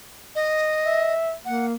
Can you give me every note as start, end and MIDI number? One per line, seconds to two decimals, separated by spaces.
0.35 1.14 75
0.85 1.33 76
1.45 1.75 58
1.45 1.66 78